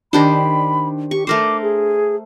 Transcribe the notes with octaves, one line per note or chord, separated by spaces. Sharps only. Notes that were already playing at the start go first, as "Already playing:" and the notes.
D#3 D4 G4 C5 B5
G4 C#6
A3 A#4 C5 D6
G#4